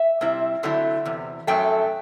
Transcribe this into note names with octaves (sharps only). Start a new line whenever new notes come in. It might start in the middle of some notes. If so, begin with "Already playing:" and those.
Already playing: E5
C3 G3 C4 E4
D3 F#3 A3 C4 E4
E2 C3
F#2 F#3 A3 G5